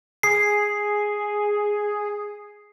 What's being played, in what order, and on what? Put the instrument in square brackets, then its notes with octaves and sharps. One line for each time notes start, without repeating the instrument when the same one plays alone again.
[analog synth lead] G#4 [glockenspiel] C7